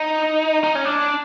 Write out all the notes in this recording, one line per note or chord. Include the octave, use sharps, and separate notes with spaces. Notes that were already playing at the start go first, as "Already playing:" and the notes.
Already playing: D#4
D#4
C#4
D4